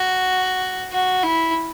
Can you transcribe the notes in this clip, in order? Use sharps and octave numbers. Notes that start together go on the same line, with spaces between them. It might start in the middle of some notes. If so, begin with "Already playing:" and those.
Already playing: F#4
F#4
E4